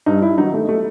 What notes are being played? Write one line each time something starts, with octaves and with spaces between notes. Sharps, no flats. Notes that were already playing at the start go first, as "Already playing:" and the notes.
G2 D#4
E4
D#3 F#3 D#4
A3
A3